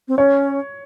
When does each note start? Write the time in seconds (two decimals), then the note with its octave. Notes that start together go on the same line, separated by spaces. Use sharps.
0.08 C4
0.18 C#4 C#5